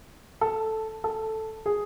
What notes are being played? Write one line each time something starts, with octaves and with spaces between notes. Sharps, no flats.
A4
A4
G#4